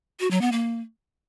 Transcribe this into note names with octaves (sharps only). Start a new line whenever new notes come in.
F#4
F#3
B3
A#3